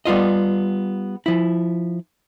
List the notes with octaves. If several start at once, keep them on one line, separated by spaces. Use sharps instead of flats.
G3 B3 F4 D#5
F3 E4